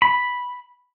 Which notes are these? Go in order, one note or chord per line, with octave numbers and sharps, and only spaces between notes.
B5